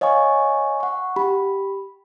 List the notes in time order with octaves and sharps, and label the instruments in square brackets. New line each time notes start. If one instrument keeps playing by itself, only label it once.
[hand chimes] C#5 D#5 F5 G#5 C#6
F#5 C#6
G4 B5